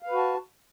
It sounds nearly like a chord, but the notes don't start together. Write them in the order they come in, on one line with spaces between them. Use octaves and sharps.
F5 B4 F#4 A5